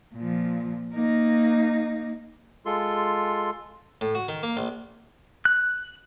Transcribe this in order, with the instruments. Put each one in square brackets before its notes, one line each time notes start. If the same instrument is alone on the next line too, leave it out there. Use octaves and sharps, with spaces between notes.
[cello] A#2 F3
A#3 D#4
[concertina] G#3 F4 A4 C6
[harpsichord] A2
F#4
D#3
A#3
A#1
[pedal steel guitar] F#6